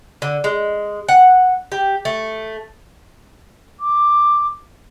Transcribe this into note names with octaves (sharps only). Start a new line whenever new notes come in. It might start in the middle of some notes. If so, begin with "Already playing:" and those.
D3
G#3
F#5
G4
A3
D6